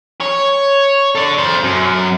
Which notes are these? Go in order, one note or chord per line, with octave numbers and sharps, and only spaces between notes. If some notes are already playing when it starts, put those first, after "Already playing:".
C#5
A4 D5
A4 C5
F#2